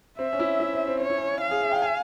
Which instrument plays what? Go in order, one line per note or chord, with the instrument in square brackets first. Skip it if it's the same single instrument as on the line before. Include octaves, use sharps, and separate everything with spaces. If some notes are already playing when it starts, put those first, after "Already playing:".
[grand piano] C4 [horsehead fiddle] E5
[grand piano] C#4
E4
E4
C4
C4
[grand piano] C#4 [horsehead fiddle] C#5
[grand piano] E4
C#4
[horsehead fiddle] F5
[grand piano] G#4
E5
G5
G#5